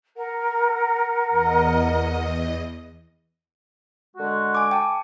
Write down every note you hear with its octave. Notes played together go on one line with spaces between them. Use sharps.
A#4 F#5
E2 D#5
D3 G#3 F#4
G#5 D6
G5 A5